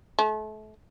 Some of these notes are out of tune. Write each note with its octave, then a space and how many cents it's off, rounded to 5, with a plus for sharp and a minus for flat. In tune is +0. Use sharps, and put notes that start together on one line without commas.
A3 -35